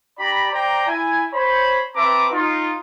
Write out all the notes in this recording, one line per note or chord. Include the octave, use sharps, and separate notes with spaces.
D4 G4 D5 A#5 B5
C5 D5 G5 A#5
E4 G#5
C5 C#5 B5
C4 B4 E5 A5 A#5 D6
D#4 F4